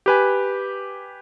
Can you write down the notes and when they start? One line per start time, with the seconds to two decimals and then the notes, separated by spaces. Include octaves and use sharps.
0.06 G4 B4 G#5